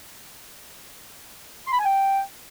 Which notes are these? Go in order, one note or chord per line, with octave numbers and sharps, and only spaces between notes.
C6
B5
G#5
G5